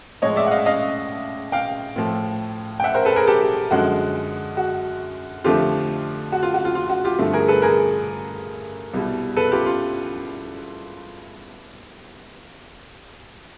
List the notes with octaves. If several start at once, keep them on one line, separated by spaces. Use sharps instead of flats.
A2 F3 G#3 C#5 D#5
D5 E5
F#5
D#5 F5
D#5 F5
F5 G5
A2 F3 A3
G5
E5 F#5
A#4 C5
A4 B4
G#4 A#4
G4 A4
F#2 D3 F3 G#3 F#4
F#4
F2 D3 F3 A3 F4 G4
F#4
F4
F#4
F4
F4
F#4
F4 G4
G2 D3 F3 A3
G#4 A#4
A4 B4
G#4 A#4
C2 B2 G3
A4 B4
F4 G4
F4